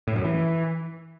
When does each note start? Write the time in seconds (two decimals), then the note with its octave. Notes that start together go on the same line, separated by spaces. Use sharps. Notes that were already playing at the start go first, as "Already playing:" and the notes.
0.07 A2
0.16 F#2
0.24 E3